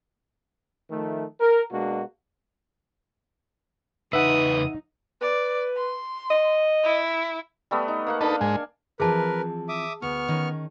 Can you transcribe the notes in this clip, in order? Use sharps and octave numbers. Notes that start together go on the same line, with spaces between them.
D#3 F3 A3
A#4
B2 G#3 A#3 D4 F#4
E2 C#3 D#4 B4 E5 F#5 D#6
B4 D5
C6
D#5
E4
G3 A3 B3
D#4
A#3 F5 F#5
D4 D#4 A4 B4
G#2 G#3 G#5
E3 F3 C4 G#4 A#4 B4 A5
E5 D6 D#6
D2 B3 C#6 F6
D#3 C#4